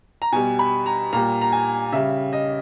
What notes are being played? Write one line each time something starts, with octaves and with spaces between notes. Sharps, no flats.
A#5
B2 G3 G#5
B5
A#5
A#2 G3 A#5
A#5
G#5
C#3 G3 E5
D#5